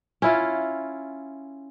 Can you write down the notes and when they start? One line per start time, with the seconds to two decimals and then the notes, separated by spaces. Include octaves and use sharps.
0.22 C#4 E4 F4